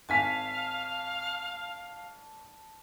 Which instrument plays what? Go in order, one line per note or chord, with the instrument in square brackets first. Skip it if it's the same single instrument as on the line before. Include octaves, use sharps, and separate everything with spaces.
[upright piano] G#1 G#5 B6 [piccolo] F5 [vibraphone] A5